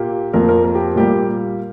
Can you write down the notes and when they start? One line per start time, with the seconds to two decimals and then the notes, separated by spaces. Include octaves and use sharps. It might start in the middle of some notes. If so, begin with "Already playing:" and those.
Already playing: A#2 A#3 G4
0.33 F2 F3 A#3 A#4
0.49 A#4
0.65 A#4
0.75 G4
0.96 A#2 G3 A#3 G4